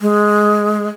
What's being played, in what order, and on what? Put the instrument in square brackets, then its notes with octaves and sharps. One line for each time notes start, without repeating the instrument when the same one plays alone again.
[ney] G#3